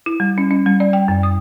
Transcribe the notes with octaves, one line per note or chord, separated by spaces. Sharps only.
E4
G3
C#4
C#4
G3
D5
G5
F#2
D#6